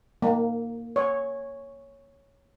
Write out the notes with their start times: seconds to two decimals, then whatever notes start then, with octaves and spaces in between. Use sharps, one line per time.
0.22 A#3
0.96 C#5